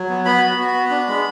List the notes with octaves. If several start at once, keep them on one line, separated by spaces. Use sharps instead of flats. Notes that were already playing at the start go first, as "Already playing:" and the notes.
Already playing: F#3
B3
B3 B5
F#4
F#4
B3
D4
G#3